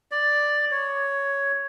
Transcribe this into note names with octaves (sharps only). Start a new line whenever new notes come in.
D5
C#5